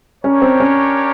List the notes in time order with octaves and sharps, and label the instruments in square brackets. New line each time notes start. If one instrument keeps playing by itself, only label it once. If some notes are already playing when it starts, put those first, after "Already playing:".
[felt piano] C#4 [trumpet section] D4 G4 A#4 C#5
[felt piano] C4
C#4